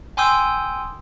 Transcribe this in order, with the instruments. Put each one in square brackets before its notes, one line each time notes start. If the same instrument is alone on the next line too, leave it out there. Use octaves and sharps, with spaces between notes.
[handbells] G5 G#5 C6 D#6 E6 G6